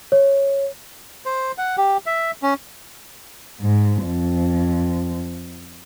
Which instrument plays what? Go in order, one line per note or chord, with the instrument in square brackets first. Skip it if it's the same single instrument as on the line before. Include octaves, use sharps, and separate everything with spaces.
[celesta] C#5
[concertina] C5
F#5
G4
E5
C#4
[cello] G#2
F2